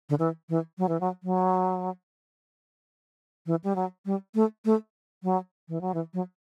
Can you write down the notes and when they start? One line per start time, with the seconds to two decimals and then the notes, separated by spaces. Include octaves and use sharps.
0.09 D3
0.19 E3
0.49 E3
0.78 F#3
0.89 E3
1.01 F#3
1.23 F#3
3.46 E3
3.64 G3
3.76 F#3
4.06 G3
4.35 A3
4.65 A3
5.23 F#3
5.69 E3
5.81 F#3
5.94 E3
6.14 F#3